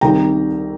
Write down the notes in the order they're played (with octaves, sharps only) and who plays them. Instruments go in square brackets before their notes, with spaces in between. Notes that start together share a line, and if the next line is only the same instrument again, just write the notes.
[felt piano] C2 C3 D#3 G5 A#5